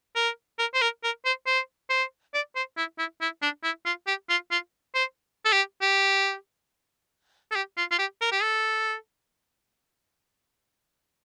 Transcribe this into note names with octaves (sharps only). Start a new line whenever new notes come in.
A#4
A#4
C5
A#4
A#4
C5
C5
C5
D5
C5
E4
E4
E4
D4
E4
F4
G4
F4
F4
C5
A4
G4
G4
A4
G4
F4
F4
G4
A#4
G4
A4